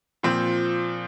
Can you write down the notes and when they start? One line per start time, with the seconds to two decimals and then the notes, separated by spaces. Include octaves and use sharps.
0.23 A#2 F3 C4